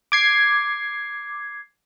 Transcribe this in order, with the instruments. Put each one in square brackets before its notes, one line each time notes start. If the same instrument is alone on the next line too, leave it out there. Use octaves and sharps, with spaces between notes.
[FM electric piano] D6 G#6 C7